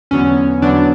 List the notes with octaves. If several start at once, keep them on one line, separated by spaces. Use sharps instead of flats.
E2 D3 F#3 B3 C#4
E2 D3 F#3 B3 D4